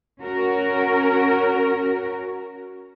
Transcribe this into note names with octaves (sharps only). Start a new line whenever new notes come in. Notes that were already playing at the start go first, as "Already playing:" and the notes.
C#4 F#4 A#4